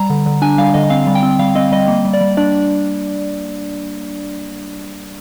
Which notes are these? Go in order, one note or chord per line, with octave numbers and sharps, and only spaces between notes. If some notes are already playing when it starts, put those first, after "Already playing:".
Already playing: G3 A#5
D3
D3
D4 G#5
G3 F5
D3 D#5
C4 F5
G3
G5
C4
G3 F5
C4 D#5
G3 D#5
A#3
G3
D5
G3
D4 D5